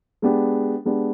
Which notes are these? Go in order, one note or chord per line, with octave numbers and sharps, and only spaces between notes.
G#3 B3 D4 G4
G#3 B3 D4 G4